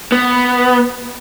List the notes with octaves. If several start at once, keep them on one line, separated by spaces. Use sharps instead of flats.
B3